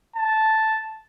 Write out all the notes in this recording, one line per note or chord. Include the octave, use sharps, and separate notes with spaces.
A5